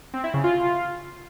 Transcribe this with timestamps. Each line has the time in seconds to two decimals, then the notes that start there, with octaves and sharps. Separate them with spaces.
0.14 C4
0.24 E4
0.34 C#3
0.44 F4